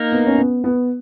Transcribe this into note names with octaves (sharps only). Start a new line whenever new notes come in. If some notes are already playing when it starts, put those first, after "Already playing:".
Already playing: A#3 D#4 A#4
B3
C#4
B3
B3